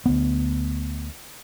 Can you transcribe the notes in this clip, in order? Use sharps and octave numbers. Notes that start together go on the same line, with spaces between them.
D2 B3